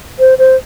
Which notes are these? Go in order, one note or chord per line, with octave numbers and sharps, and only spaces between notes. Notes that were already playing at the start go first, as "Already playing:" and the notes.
C5
C5